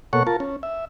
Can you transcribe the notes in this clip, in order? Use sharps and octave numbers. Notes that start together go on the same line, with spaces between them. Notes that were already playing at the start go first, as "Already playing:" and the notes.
B2 A#3 A4 C#5 F#5 C#6
F4 A#4 A5
C#4
E5